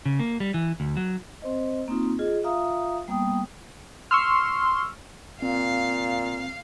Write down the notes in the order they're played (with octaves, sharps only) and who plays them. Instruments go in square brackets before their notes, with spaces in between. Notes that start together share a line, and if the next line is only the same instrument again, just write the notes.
[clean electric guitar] C#3
A#3
G3
E3
D2
F#3
[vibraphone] C4 C5 D#5
A#3 C4 D#4 F4
F4 G#4 D#5
F4 E5 F5 A#5 D#6
G3 A#3 B3 G5 D#6
[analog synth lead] C6 [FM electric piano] C#6 E6 F6
[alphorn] A#2 [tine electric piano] C4 [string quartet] F5